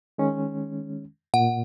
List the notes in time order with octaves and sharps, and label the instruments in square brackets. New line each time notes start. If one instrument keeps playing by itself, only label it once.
[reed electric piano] D#3 G#3 C#4
[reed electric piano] A#2 [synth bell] F#5